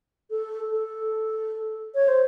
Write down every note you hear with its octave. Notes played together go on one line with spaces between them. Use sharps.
A4
A4
C#5
C5